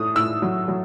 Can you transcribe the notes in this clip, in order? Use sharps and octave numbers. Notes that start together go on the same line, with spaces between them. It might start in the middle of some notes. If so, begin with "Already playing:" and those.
Already playing: A2 A3 D#6
A2 E6
F#3
F#3